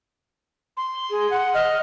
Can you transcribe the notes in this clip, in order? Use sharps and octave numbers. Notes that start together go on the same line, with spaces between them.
C6
G#4
F#5
D#5 F6